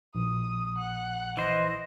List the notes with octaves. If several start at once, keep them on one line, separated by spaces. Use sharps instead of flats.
A#1 D#6
F#5
E3 C5 D#5